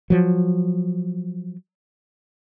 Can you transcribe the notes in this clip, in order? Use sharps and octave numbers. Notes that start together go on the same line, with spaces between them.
F3 F#3